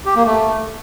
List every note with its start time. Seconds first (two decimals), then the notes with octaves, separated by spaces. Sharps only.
0.05 G4
0.16 A#3
0.26 A3